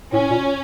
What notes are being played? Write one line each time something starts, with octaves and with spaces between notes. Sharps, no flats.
A2 C#4
A#2